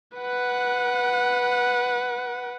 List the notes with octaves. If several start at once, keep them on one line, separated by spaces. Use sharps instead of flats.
B4 F#5